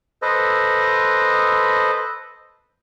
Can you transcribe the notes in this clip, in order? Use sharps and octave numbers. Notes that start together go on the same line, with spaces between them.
A4 B4 C5 D#5